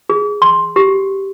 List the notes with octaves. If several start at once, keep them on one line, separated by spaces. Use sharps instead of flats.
G#4
C6
G4